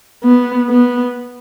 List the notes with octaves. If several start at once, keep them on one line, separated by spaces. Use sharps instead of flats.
B3
B3